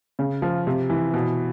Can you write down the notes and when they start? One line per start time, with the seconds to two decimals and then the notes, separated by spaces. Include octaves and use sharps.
0.19 C#3
0.42 F3
0.67 C3
0.90 E3
1.14 B2